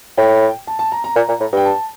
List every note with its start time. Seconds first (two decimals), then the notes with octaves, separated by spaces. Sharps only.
0.17 A2 G5
0.67 A5
0.79 A5
0.92 A#5
1.04 A#5
1.16 A#2
1.29 A#2
1.41 A2
1.53 G2 G5
1.65 A5